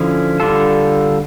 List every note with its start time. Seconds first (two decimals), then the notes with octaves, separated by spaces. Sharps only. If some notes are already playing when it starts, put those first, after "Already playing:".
Already playing: D3 F3 C#4 E4
0.40 D3 G3 D4 F4 A4